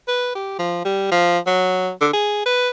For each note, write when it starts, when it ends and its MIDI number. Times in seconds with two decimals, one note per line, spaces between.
0.08 0.34 71
0.35 0.54 67
0.59 0.81 53
0.85 1.09 55
1.12 1.39 53
1.47 1.90 54
2.01 2.09 50
2.13 2.45 68
2.46 2.70 71